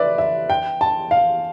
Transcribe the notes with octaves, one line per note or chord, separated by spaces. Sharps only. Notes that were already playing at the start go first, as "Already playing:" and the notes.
Already playing: B4 D5 E5
E5
G5
A5
F5